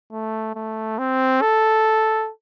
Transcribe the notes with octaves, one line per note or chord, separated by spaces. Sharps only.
A3
A3
C4
A4